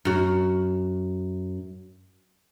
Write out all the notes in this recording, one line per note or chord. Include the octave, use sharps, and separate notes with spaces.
F#2 F#4